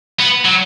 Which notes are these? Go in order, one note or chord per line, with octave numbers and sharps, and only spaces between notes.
B3
F#3